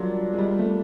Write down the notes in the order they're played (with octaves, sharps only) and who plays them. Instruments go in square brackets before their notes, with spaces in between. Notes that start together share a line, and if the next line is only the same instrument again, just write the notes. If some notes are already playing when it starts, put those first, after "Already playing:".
Already playing: [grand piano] F#3 G3 [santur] A#3 D4 F4
[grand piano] G#3
G3
A3